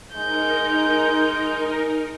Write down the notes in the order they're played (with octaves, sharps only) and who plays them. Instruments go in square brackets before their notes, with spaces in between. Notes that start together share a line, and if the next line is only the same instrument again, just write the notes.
[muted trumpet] G#3 [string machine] D#4 A#4 [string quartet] G6